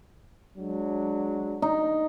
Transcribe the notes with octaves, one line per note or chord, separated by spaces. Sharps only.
F#3 G#3 D4
D#4